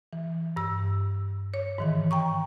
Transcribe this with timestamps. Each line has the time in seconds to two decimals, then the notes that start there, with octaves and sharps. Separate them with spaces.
0.13 E3
0.56 G2 E6
1.54 C#5
1.78 G#2 D#3 E3
2.11 G5 A#5 C#6